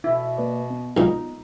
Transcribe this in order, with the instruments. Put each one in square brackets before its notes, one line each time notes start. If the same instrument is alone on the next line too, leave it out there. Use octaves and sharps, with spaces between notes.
[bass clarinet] B2 [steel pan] E4
[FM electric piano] A#3 B4 D5
B3
[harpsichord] B1 A#2 [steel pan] D#4